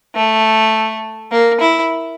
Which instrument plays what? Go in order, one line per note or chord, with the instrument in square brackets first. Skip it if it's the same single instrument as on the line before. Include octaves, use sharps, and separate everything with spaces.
[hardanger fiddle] A3
A#3
E4